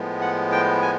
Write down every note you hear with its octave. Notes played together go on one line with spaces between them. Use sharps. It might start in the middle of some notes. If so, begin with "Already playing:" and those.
Already playing: A2 F3 G#3 B3
F#5
G5
G#5